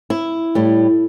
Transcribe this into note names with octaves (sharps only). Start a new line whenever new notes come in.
E4
A2 G3